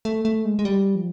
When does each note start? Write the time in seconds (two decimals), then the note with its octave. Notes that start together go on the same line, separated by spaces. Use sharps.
0.05 A3
0.25 A3
0.45 G#3
0.59 G#3
0.65 G3
0.95 F3